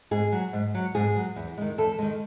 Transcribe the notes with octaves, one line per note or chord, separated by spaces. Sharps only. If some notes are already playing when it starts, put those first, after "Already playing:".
G#2 G#4
F#3
G#2
F#3
G#2 G#4
F#3
E2
D#3 G#3
E2 A4
D#3 G#3